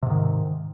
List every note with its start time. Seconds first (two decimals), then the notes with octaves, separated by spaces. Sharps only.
0.03 C3
0.06 G#2
0.10 D#3